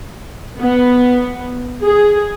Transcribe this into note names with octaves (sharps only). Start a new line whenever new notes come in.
B3
G#4